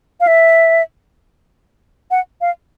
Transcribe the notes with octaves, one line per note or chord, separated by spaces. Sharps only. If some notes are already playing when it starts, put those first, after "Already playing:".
F5
E5
F#5
F5